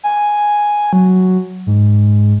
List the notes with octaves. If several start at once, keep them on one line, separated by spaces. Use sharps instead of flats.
G#5
F#3
G#2